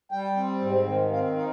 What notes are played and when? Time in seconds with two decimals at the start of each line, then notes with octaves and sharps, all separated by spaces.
0.12 G3 G5
0.37 C4
0.61 G#2
0.86 D#3
1.11 C4 F5
1.36 D#4 F5